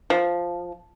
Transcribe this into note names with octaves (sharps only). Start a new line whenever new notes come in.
F3